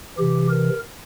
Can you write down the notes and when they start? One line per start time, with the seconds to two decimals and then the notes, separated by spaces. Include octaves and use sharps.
0.17 C3 E3 G4
0.50 A#4